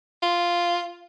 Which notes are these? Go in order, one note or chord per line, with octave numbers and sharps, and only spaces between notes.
F4